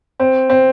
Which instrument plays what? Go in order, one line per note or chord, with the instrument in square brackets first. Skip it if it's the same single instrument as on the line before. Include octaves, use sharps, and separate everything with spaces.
[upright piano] C4
C4